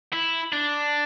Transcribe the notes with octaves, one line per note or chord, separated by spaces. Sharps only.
E4
D4